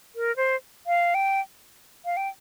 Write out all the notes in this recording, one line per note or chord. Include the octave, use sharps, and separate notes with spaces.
A#4
C5
F5
G5
F5
G5